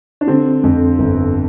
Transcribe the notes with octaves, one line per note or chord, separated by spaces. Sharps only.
D4
D3 C4
F2
G1